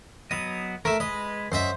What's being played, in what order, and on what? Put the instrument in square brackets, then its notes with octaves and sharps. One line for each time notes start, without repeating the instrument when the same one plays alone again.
[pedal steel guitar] F#3 B3 D#5 [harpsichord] D#6
[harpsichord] A3 [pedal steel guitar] A#4 E5
[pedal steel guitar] G#3 B4 [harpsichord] D#5
[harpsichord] F#2 D#5 E5 [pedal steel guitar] C5